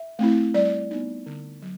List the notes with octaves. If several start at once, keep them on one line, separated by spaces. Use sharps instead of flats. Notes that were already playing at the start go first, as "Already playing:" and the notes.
Already playing: E5
A3 C4 E4
G3 D5
B3 D#4
D3
F#3